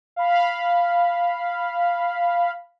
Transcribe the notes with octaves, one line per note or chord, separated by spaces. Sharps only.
F5 B5